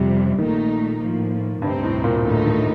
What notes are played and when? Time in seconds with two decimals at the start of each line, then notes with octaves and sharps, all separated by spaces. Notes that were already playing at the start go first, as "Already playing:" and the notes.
Already playing: F2 C3 F3 G3
0.38 A#1 A#2 D#3 A3 D#4
1.00 A2 F3 A#3
1.62 D2 G2 C3 G3 C4 D#4
1.83 A2
2.04 A#2
2.24 A2 D3 A3 D#4
2.46 D#3